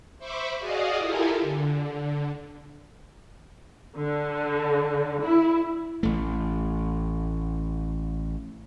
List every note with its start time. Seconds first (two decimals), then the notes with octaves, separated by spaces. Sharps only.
0.19 C5 E5 B5 C#6 D6
0.59 F#4 G#4 D5 D#5 F5 D#6
0.97 E4 F4 G4 A4 A#4 G#5
1.41 D3
3.95 D3
5.21 E4
6.03 A1 A3